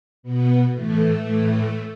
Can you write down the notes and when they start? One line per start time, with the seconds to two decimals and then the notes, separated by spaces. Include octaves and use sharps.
0.23 B2 B3
0.73 A2 E3 A3
1.23 A2 E3